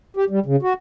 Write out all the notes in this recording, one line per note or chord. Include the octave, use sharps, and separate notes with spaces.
G4
G3
C#3
F#4